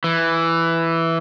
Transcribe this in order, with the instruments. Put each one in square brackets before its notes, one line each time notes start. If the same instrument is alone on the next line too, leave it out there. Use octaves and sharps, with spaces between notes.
[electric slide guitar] E3